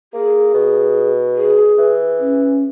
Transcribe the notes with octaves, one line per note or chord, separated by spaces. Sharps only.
A#3 G#4
B2
G#4
E3
C#4